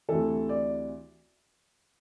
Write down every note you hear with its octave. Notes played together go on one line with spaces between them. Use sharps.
D2 C3 E3 A4
D5